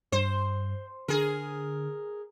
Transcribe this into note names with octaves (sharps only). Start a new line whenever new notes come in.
G2 C5
D3 G#4 A#4